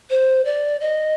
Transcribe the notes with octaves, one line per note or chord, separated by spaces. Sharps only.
C5
D5
D#5